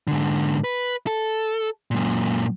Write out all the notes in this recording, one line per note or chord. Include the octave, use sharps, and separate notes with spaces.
G#2 D3
B4
A4
F#2 A#2